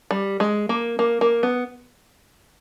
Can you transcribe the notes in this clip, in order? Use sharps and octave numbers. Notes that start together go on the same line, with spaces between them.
G3
G#3
A#3
A#3
A#3
B3